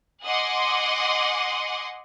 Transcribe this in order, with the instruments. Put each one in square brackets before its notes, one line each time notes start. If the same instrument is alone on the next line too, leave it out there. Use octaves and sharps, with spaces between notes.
[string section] D#5 F#5 G#5 C6 D6